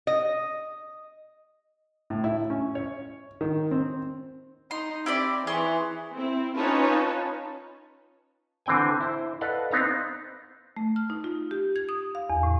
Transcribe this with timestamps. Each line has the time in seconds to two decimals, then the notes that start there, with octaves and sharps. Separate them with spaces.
0.07 D#5
2.10 A2
2.24 E4
2.50 C#4
2.75 C#5
3.41 D#3
3.71 C4
4.71 D#4 C6
5.06 C4 E4 G4 D5
5.47 E3 G#4 C6 C#6
6.15 C4 E4
6.57 C#4 D#4 F4 B4 C#5 A5
8.66 D3 E3 C4 G5 G#5
9.01 E4 C5
9.41 A4 B4 D5 D#5 F5 F#5
9.71 B3 C4 D#4 F5 A#5
10.77 A3
10.96 F6
11.10 D#4
11.24 F4
11.51 G4
11.76 G#6
11.89 D#6
12.15 F5
12.30 E2
12.43 A2